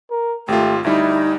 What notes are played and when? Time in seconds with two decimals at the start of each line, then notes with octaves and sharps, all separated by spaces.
0.11 A#4
0.48 G#1 A3 F4 G4
0.84 D2 G3 D#4 E4